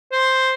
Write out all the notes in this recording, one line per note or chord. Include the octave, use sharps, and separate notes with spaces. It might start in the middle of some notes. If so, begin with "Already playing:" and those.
C5